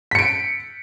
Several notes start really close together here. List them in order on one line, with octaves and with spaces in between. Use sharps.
B6 C#7 D7